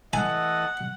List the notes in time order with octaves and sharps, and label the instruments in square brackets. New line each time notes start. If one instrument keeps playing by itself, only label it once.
[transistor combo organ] E3 A3 A5 [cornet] D#5 [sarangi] F#5 [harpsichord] G#5